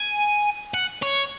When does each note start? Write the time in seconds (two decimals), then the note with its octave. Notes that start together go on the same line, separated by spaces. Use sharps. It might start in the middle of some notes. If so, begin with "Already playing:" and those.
Already playing: G#5
0.74 F#5
1.02 C#5